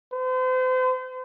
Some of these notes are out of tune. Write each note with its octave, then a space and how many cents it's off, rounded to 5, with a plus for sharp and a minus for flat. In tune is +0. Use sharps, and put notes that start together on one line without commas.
C5 -40